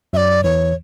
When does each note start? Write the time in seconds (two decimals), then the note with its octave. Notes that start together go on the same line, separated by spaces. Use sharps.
0.13 F#2 F#3 E5
0.17 D5
0.44 E2 E3 C#5